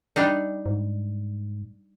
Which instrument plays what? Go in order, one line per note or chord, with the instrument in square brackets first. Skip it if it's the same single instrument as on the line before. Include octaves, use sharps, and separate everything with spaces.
[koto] G3 D4 D#4
[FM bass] G#2